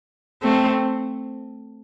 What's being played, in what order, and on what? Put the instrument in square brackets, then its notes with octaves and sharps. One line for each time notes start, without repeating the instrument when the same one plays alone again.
[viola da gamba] A3 C4